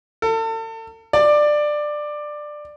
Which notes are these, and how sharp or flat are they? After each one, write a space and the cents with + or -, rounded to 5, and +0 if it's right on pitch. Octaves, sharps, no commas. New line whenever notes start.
A4 +40
D5 +15